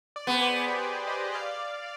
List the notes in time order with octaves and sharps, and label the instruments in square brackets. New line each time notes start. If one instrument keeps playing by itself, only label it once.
[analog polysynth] D5
[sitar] B3 [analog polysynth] G#4 C5
[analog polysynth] B4 D5
B4 D5
G4 B4
B4 D5
C5 D#5
D5 F5